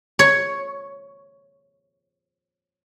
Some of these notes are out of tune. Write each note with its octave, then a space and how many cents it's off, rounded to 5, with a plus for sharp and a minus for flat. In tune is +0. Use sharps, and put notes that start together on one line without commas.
C#5 +5